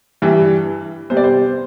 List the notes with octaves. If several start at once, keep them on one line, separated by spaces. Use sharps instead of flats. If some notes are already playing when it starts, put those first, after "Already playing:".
G2 E3 G3
C3 G3 B3 C5
D5
C5